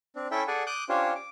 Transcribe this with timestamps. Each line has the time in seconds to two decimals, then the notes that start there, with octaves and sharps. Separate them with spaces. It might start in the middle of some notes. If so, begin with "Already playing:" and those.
0.16 C4 D4
0.31 C#4 E4 A4 E5 G5
0.48 G#4 A4 D5 F#5 G#5
0.67 D6 D#6 F#6 G6
0.89 C#4 D4 F4 G4 C5 C#5
1.15 D6